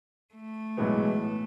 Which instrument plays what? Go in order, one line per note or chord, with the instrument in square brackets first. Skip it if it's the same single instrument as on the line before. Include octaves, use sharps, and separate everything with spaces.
[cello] A3
[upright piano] B1 A2 E3 G#3 B3